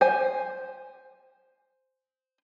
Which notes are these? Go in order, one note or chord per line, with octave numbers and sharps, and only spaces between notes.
C5 G#5